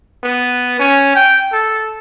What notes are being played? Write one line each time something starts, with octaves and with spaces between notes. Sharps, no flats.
B3
C#4
G5
A4